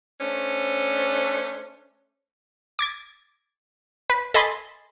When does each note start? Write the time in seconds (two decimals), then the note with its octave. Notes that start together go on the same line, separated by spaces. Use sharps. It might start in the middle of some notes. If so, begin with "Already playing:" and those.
0.20 A3 C#4 D4 C5
2.79 D6 G#6 A6
4.10 B4
4.34 A4 D#5 G#5 B5 C6 A6